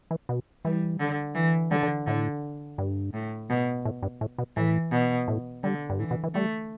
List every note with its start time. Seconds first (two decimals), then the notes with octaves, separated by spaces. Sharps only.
0.11 E3
0.29 B2
0.65 E3 G3
1.00 D3
1.35 E3
1.71 D3 G3
1.83 D3
2.07 A2 D3
2.78 G2
3.14 A2
3.50 B2
3.85 A2
4.03 G2
4.21 A2
4.38 B2
4.57 A2 E3
4.92 B2
5.28 A2
5.64 D3 G3
5.90 G2
5.99 A2 E3
6.11 B2
6.23 E3
6.35 G3 A3